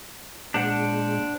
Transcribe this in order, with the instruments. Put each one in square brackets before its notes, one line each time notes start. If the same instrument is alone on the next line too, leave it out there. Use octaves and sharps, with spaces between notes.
[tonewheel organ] A#2 G#3 [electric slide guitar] D4 C5 F#5